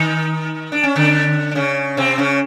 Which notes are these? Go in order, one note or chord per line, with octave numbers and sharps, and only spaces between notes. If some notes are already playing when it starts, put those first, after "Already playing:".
Already playing: D#3 D#4
D4
C#4
D3 D4
D4
C#3 C#4
C3 C4
C#3 C#4